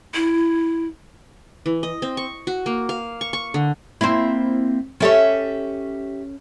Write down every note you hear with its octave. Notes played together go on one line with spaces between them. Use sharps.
E4
E3
D#5
C4
C#6
F#4
A#3
F5
C#6
C#6
D3
A#3 C4 E4 C5 E5
C#4 G4 A4 C#5 E5